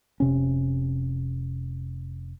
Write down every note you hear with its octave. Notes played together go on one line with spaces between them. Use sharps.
F1 C3 C#4